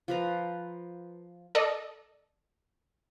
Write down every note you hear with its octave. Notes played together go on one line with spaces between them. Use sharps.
F3 B4 A#5
A4 D5 D#5